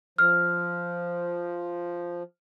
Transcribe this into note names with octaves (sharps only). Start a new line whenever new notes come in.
F3 F6